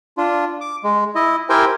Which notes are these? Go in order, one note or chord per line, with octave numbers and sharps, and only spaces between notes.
D4 F4
D6
G#3
E4 D#5
E4 G4 A#4 C5 G5 G#5